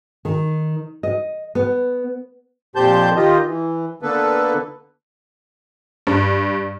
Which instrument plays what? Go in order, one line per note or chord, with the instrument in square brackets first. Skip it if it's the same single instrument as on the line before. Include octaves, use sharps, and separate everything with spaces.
[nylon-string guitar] D#3
D#5
B3
[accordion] F2 A#2 G4 C5 A5 G6
D#3 F4 G4 D#5
E3
D3 A#3 B3 A4 B4
[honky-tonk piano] G2